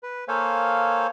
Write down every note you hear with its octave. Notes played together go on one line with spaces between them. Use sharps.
B4
A#3 A4 C5 C#5 F5 G#5